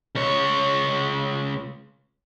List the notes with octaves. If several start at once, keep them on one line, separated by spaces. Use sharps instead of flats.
C#2 C#5